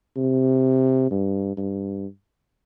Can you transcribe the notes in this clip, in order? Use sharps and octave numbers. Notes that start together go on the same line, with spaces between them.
C3
G2
G2